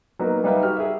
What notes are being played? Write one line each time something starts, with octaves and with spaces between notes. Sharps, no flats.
F#3 A#3 B3 D#4
G3 D#4 B4 E5 F5 G5
F#4 G4 F6
G#4 E5